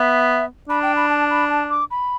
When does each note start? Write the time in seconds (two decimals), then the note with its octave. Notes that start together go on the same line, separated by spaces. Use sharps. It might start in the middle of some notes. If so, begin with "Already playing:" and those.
Already playing: B3 E5
0.69 D4 B5
0.83 G5
0.96 B5
1.10 A5
1.30 B5
1.49 A5
1.70 D6
1.91 B5